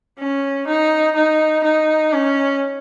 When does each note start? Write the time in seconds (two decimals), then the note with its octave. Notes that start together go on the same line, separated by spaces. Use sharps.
0.19 C#4
0.68 D#4
1.16 D#4
1.64 D#4
2.13 C#4